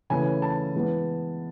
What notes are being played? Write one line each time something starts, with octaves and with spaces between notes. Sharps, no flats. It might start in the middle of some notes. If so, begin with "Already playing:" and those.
C#3 E3 A3 C#4 G#5
A5
E3 G#3 B3